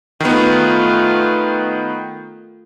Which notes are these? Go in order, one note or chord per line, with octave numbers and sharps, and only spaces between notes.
D#3 A3 B3 F4